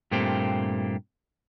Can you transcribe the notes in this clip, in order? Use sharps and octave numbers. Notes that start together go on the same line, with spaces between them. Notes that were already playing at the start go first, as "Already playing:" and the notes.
G2 A#2 A3 A#3 C4 G4